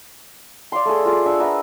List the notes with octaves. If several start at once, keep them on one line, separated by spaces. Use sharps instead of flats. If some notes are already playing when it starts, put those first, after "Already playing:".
D5 F5 C6
A3 G#4
F4 G#4
D4 E5 C#6
A#4 B4 E5 F#5